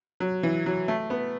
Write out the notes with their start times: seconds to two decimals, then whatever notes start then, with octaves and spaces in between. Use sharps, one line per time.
0.20 F#3
0.43 E3
0.66 F#3
0.88 A3
1.10 B3